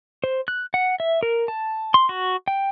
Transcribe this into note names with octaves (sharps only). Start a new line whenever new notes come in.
C5
F#6
F#5
E5
A#4
A5
C6
F#4
G5